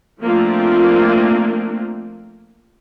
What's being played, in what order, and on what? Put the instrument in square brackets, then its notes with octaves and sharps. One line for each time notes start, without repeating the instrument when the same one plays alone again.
[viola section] F3 A3 A#3 C4 D4 F4